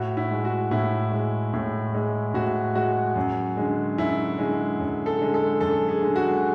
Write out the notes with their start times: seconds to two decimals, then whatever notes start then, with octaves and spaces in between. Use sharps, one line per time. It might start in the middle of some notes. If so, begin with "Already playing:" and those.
Already playing: A2 F#4
0.17 E4
0.31 G#3
0.45 F#4
0.71 A2 E4
1.12 G#3
1.53 A2
1.94 G#3
2.34 A2 F#4
2.75 G#3 F#4
3.16 F#2
3.57 D3 G#3
3.98 F#2 E4
4.38 D3 G#3
4.79 F#2
5.06 A4
5.20 D3 G#3
5.34 A4
5.61 F#2 A4
5.89 G#4
6.02 D3 G#3
6.16 F#4